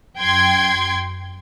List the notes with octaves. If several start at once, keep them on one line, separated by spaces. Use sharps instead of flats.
F#2 G5 C6 G#6